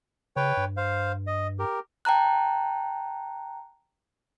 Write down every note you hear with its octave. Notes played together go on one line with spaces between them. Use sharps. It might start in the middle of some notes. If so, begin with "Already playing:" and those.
C#3 B4 C#5 G5
G2
C5 F5
D#5
G4 A#4
G5 A5 A#5 F#6